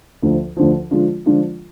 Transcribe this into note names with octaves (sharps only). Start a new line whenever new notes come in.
D2 D3 F3
D2 D3 F3
D3 F3 G#3 D4 F4
D3 F3 G#3 D4 F4